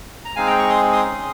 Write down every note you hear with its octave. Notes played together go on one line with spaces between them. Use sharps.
A#5
G#3 C4 D#4 G#4 F5 G#5
G5 A#5
A#5 C#6
C6 D#6
C6 D#6
C#4 G#4